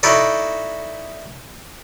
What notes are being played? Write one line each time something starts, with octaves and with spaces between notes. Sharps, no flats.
D#4 E4 F#4 A4 D5 D#5